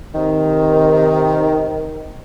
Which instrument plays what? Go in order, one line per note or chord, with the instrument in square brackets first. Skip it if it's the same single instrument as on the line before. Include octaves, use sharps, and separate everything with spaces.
[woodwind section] C3 D#3